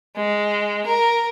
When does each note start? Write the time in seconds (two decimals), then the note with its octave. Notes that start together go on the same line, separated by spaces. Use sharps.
0.16 G#3
0.87 A#4